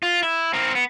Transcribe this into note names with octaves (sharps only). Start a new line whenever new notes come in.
F4
E4
C4 A#4
B3